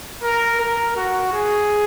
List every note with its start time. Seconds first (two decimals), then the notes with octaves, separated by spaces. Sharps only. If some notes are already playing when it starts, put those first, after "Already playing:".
0.23 A#4
0.60 A#4
0.96 F#4
1.33 G#4